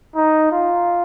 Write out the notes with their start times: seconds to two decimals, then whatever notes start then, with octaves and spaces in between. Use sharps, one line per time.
0.16 D#4
0.52 F4